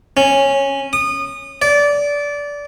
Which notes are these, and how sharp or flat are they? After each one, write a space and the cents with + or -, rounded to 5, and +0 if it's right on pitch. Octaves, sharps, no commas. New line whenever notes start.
C#4 -10
D#6 -25
D5 -20